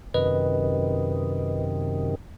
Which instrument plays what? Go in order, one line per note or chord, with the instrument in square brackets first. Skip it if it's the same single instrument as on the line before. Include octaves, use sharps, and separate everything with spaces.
[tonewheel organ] F#2 C3 D#3 [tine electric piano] B4 D#5